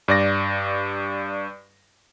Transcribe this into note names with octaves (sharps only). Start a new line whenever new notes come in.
G2 D5 A#6